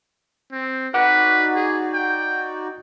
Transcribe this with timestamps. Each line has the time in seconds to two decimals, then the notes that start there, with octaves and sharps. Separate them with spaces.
0.52 C4
0.94 D#4 F#4 B4 D5 F#5 D6
1.55 G#4
1.94 G5